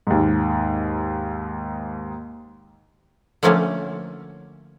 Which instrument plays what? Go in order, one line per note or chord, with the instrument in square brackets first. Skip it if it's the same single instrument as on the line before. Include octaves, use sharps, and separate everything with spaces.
[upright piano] D#2 G#2
[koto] D3 F3 A3 A#3 C#4